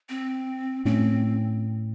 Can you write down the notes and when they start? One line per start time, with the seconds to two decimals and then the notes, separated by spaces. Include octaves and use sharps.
0.09 C4
0.85 A2 A3 C4 C#4